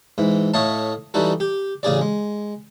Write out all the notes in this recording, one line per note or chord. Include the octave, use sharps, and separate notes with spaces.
G#2 E3
A2 A3 C#5 D#5 F5 A5
E3 G3 D#4 F#4 A4
G4
A1 C#3 G#4 D5
G#3